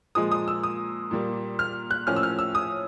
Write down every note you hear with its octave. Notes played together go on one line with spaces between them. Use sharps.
A#2 F3 G#3 D#6
D#6
E6
D#6
A#2 G3 A#3
F6
F#6
A2 F3 A#3 C#4 F6
E6
F6
E6
D#6